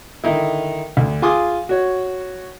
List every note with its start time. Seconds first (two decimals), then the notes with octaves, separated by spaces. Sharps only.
0.24 D3 D#3 D#4 E4
0.97 D2
1.22 F4 G#4 G#5 C6 D6 D#6
1.69 F#4 C#5